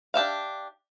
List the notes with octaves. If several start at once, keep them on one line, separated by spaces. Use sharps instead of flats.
D4 G4 E5 F5